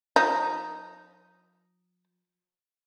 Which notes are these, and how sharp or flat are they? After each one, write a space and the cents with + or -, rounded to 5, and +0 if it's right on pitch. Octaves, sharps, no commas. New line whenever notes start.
F3 +45 D#4 +0